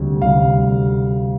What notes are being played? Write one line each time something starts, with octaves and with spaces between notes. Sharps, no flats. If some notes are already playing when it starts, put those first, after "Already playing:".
Already playing: D2 C3 G3
D2 C3 G3 F5